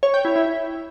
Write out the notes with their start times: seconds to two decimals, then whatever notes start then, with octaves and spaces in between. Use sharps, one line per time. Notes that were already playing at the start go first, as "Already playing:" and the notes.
0.03 C#5
0.14 G5
0.25 E4
0.36 E4